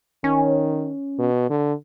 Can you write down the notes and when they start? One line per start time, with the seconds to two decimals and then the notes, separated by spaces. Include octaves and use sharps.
0.24 D#3 C#4
1.19 B2
1.50 D3